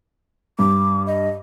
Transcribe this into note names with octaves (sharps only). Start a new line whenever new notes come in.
G2 D6
D#5